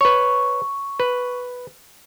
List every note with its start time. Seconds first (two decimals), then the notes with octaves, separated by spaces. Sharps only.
0.01 B4 C#5 C#6
1.00 B4